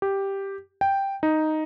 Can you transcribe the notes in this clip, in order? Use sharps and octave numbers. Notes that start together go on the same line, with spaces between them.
G4
G5
D#4